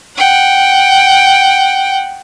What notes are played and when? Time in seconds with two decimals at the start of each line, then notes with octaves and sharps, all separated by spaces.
0.17 F#5 G5